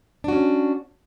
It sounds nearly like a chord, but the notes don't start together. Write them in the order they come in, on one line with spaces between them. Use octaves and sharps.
D4 F#4 C#4